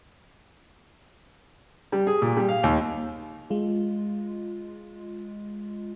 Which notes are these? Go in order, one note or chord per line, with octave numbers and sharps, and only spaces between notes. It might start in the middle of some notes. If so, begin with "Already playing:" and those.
G3
G#4
A#2
G3
F5
D#2
G#3 F4